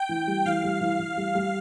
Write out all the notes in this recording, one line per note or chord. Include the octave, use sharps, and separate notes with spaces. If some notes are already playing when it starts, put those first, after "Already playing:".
Already playing: G5
E3
G3
E3 F5
G3
E3
E3
G3
G3